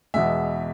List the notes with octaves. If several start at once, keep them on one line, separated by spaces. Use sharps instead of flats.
E2 B2 G#3 E5